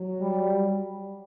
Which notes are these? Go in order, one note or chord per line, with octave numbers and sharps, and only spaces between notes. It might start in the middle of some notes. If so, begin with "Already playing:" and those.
Already playing: F#3
G3